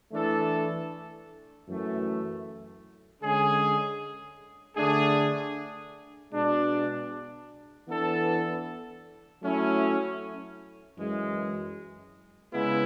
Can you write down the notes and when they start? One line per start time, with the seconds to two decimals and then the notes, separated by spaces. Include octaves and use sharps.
0.11 E3 A3 D4 A4
1.67 F#2 E3 A3
3.22 D3 G#3 C#4 G#4
4.77 D3 A3 D4 G#4
6.31 B2 G#3 D4
7.87 E3 B3 D4 A4
9.42 F#3 A3 C#4 E4
10.97 F#2 E3 G#3
12.52 C#3 G#3 B3 E4